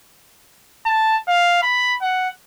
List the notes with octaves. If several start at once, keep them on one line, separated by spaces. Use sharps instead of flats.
A5
F5
B5
F#5